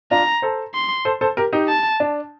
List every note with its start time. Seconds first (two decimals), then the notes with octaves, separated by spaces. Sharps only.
0.11 D4 F4 A#5
0.42 A4 C5
0.75 C6
1.05 A4 C5
1.21 A4 C5
1.37 G4 A#4
1.53 D#4 G4
1.68 A5
2.00 D4